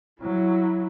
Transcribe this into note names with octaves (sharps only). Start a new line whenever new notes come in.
F#3 E4